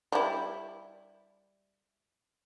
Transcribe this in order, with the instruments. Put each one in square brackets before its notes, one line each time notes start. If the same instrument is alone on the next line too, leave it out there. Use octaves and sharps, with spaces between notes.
[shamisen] G3 E4